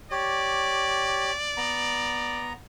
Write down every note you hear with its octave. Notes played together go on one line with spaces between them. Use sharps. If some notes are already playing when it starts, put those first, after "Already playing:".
G4 C#5 D5
B3 A#5